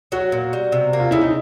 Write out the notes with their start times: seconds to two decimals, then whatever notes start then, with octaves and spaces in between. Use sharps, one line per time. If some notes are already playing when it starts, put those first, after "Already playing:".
0.12 F#3 F#4
0.32 A#2
0.53 G3
0.72 C3
0.93 A#3
1.00 F4
1.11 C#3 E4
1.21 D#4